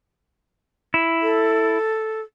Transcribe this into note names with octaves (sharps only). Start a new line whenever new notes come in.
E4
A4